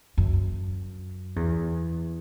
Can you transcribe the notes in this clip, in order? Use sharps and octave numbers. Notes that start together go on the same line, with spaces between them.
F#2
E2